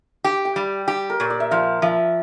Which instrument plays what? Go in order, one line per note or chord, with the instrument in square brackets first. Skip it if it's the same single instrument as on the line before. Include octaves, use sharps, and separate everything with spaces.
[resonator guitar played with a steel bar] G4 [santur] G5
[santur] G5
[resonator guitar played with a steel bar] G3
G4
[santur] A#4
[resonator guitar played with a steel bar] A#2 [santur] C#5
[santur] D5
E5
[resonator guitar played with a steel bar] F3 [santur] F5
[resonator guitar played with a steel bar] F3 [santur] E5